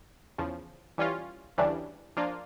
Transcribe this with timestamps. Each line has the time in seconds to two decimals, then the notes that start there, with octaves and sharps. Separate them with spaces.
0.38 E2 C#3 F3
0.98 E3 G3 C#4 F4
1.58 D2 C#3 E3 G3 D4
2.17 F3 A#3 D4 F4